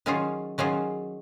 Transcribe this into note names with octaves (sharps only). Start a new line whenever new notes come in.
D#3 F#3 C#4 F4 G#4
D#3 F#3 C#4 F4 G#4